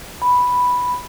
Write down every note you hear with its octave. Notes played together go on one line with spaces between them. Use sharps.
B5